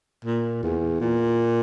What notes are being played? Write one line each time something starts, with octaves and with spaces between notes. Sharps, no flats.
A#2
E2
A#2